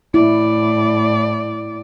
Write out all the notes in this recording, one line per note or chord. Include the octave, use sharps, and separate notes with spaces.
A2 E4 D5